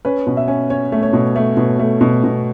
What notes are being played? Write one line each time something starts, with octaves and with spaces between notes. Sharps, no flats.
C#4 B4
B2
E5
C#4
C#4 C#5
A3
C#5
B2
A3
B2
A3
B2
B2